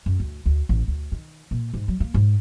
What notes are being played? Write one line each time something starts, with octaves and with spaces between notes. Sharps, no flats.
F#2
D2
D2
A1
D2
D#3
A#2
G#2
F#3
A#3
G#2